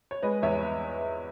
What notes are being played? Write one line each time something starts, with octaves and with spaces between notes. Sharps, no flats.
C#5
G#3 B4 D#5
E2 C#5 E5